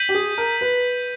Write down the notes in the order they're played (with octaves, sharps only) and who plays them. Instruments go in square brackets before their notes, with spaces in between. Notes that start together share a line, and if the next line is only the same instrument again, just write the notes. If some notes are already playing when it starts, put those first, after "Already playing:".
Already playing: [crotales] G6 B6 D#7 F#7
[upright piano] G4
G#4
A#4
B4